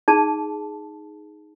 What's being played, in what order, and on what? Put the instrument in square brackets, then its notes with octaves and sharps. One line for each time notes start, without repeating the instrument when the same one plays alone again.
[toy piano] D#4 G#4 A5